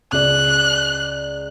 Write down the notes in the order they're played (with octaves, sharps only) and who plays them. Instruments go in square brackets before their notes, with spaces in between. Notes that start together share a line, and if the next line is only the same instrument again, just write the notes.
[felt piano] C#2 D5 [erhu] F#6